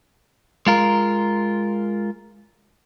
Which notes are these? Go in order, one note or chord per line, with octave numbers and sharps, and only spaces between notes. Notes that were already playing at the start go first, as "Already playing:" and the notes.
G#3 F4 A#4